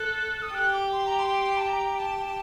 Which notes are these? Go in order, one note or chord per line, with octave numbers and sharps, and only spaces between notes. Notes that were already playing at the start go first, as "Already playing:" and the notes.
Already playing: A4 F#6
D#6
G4 F#6
D6
C6
A#5
C6
A5
A#5
A5
A5